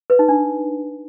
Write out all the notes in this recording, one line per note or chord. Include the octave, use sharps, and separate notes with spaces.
B4
D#4
D4